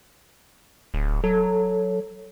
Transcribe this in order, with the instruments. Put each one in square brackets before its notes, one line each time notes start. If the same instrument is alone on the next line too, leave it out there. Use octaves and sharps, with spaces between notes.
[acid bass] D1
[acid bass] F#3 [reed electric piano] A4